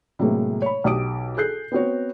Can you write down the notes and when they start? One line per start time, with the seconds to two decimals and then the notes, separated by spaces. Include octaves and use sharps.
0.19 A2 C3 F#3 G#3 A#3
0.62 C#5 B5
0.84 B1 G4 D#6 D7
1.37 G#4 A4 F#6 G6 C7
1.72 B3 C4 F#4 C#5